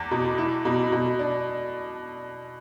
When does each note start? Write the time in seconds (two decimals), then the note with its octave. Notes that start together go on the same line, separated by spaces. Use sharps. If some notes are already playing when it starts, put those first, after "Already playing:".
Already playing: E2
0.11 B2
0.38 E4
0.65 B2
0.92 B2
1.19 D4